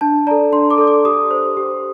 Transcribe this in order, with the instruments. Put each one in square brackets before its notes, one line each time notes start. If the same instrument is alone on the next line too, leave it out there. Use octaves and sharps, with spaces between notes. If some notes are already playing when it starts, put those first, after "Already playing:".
[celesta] D4 A5
D5 A#5
A4
D4 C6
D6
A4 D5
D6
G4 D#6
C5
G4